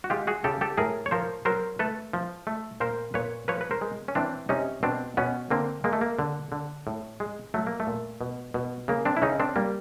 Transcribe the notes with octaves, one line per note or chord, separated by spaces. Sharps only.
F#4
G#3 F4 G4
F#4 G#4
C#3 G4 A4
G4 A4
A2 G#4 A#4
C#5
F3 A#4 C5
F#3 A#4 C5
A3 A4 B4
F3
A3
A#2 A#4 C5
A#2 B4 C#5
F3 B4 C#5
B4
A#4 C5
G#3
C#4
E3 C4 D4
C3 C#4 D#4
B2 C4 D4
B2 B3 C#4
D3 A#3 C4
G#3 A#3
A3
A#3
D3
D3
A2
G#3
F#3 A3
A#3
A3
A#2
B2
B2
C#3 A#3
C4 D4
E4
C#3 C#4 D#4
C4 D4
G3 A#3